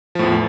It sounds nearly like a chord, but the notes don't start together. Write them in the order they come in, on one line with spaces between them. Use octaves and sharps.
F3 A2 E2